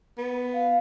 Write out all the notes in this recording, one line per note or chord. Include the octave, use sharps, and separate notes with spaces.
B3
F5